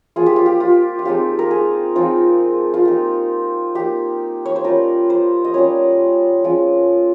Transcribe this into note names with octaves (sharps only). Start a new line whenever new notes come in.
F3 A#3 F4 G#4
G4
F4
G4
F4
F4
F3 G#3 C4 D#4 G4
A#4
G#4
F3 G#3 C4 D#4 F4
F4
A#3 D#4 G4
A#3 D#4 G4
C#5
C5
G3 C#4 F4 A#4
C5
D#5
G3 C#4 F4 C#5
F3 G#3 C#4 F4